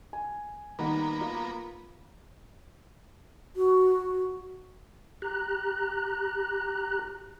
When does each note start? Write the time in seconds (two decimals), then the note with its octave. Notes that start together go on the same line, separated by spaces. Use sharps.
0.13 G#5
0.79 D#3 G3 A#3 B3 F#5
1.21 F4
3.56 F#4
5.22 G4 A#5 F#6